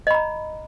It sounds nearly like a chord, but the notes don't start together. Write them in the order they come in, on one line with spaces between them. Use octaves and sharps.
D#5 B5 A#5